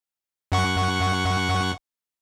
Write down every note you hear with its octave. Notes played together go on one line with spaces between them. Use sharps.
F#2 F#5 C#6